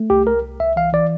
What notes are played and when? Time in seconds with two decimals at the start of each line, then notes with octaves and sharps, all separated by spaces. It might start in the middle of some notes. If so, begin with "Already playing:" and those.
Already playing: A3
0.10 C2 G4
0.27 C2 A#4
0.43 C2
0.60 C2 E5
0.76 E3 F5
0.93 E3 D5